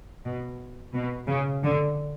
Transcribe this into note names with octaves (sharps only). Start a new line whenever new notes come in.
B2
B2
C#3
D3